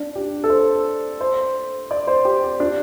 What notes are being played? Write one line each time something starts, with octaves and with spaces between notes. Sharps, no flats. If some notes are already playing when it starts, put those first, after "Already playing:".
Already playing: D4
G4
A4
C5
C5
D5
C5
G4
G4
D4